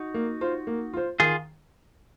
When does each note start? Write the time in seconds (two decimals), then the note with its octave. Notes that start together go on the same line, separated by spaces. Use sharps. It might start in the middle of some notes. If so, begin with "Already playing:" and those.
Already playing: D#4 F#4
0.14 A#3
0.41 F4 C5
0.67 A#3
0.93 F4 C5
1.20 D#3 F4 G#4